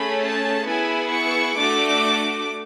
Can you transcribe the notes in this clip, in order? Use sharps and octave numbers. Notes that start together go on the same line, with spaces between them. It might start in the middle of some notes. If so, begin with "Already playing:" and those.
Already playing: A3 C#4 G#4 B5
A5
B3 E4 G#4 G#5
C#6
A3 D4 F#4 D6